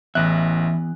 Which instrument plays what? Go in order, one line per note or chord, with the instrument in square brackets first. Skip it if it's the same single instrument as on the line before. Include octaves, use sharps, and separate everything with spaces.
[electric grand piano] A1 F#6 [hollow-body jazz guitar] E2 [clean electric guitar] E3 E5